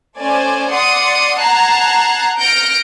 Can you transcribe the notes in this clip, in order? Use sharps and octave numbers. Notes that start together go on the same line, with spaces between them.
A3 C#4 C5 D5 G#5
D5 F#5 C6 D#6 C#7
F#5 A5 A#5 F#6 G#6 C7
F6 G6 A#6 C#7 D7